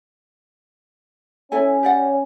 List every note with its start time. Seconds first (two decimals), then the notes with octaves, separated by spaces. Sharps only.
1.52 C#4 E4 A4 G#5
1.83 G4 D5 F#5